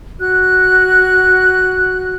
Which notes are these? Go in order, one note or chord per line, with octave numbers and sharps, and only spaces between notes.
F#4 F#6